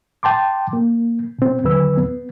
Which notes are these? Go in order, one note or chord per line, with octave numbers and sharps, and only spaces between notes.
G5 A5 C6 D6
A#3
B2 C4
D#2 D3 F#3 B4 E6
B3